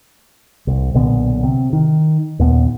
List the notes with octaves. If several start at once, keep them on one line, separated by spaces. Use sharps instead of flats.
C2
B1 A#2 D3 B3
C3
D#3
D#2 A#2 B3